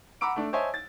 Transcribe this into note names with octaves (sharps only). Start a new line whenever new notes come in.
F#5 A#5 B5 D6 E6 D7
A3 D4
C5 C#5 D#5 E5 G#5 A5
A6